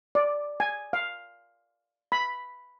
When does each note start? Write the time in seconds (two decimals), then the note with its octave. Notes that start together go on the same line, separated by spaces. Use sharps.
0.15 D5
0.60 G#5
0.93 F5
2.12 B5